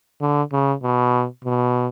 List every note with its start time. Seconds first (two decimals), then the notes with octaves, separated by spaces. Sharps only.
0.21 D3
0.52 C#3
0.83 B2
1.44 B2